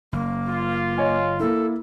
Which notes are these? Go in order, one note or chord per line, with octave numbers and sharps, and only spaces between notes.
F#1 A#3
F4
C#5 D#5 G#5
A#3 E4 A4